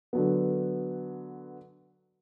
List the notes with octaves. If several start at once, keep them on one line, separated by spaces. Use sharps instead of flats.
D3 F#3 B3